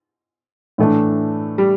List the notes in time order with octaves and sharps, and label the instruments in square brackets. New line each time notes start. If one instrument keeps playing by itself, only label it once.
[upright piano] A2 E3 A3 D4
[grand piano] G3